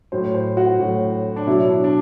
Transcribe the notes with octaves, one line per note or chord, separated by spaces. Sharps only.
A2 F#3 C5
C5
F#4
A2 F#3
D4
B2 F#3 E4
D4
D4